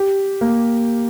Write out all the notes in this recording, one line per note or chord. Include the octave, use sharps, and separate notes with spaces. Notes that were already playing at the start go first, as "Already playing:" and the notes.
Already playing: G4
A#3